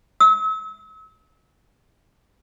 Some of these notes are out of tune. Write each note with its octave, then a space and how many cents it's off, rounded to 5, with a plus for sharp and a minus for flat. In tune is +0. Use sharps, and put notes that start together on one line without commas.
E6 -40